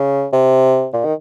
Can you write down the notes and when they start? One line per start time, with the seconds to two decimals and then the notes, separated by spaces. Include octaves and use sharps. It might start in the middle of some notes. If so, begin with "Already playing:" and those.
Already playing: C#3
0.33 C3
0.94 A#2
1.05 D#3